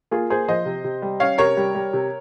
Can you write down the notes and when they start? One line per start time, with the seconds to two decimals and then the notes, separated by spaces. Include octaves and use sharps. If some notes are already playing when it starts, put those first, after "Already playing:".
0.11 A#3 F4 G#4
0.30 A#3 G#4 C5
0.48 F3 C5 D#5
0.66 C3
0.84 C3
1.02 G3
1.20 C#4 C#5 F5
1.38 C3 A#4 C#5
1.57 G3
1.75 G3
1.93 C3